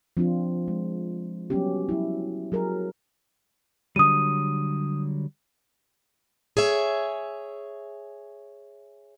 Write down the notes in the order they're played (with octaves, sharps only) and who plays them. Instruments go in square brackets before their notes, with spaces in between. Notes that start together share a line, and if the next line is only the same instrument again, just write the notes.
[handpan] F3 C4 D4 F4
G#3
F#3 G3 B3 C#4 G4
F#3 E4
F#3 G#4 A#4
[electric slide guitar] D3 F#3 G3 [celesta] D#6 D#7
[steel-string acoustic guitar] G#4 C#5 E5